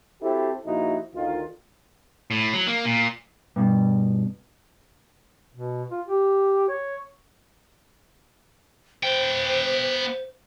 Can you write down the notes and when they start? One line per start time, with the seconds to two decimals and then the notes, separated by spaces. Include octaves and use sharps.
0.21 C4 E4 F#4 G4 A4
0.66 A#1 A#2 F3 D#4 E4 F#4
1.14 D2 D#3 F4
2.31 A2
2.53 F#3
2.67 A#3
2.85 A#2
3.56 G2 B2
5.55 B2
5.91 F4
6.08 G4
6.69 C#5
9.03 B3 C5 G5